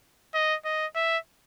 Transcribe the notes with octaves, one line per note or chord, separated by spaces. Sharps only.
D#5
D#5
E5